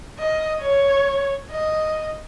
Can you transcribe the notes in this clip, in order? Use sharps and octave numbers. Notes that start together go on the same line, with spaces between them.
D#5
C#5
D#5